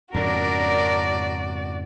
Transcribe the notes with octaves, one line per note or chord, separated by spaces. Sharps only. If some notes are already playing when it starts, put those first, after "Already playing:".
F2 G#2 C#3 C#4 D4 F#4 A#4 D5